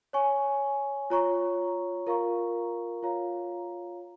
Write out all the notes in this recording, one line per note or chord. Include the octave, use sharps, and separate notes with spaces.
C#5 G#5 C#6
F4 C#5 A#5 C#6
F4 A#4 F5 A#5 C#6
F4 C#5 F5 A#5